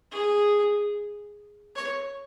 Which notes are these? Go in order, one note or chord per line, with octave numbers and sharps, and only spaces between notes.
G#4
C#5